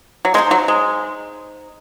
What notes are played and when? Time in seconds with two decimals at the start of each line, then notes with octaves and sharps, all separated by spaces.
0.25 F#3
0.34 G#3 D#4 F#4 C5
0.51 F#3
0.68 G#3